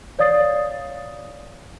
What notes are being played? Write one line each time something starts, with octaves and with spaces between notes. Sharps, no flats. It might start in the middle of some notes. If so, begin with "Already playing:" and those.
C#5 D5 F5 D#6 A6 C7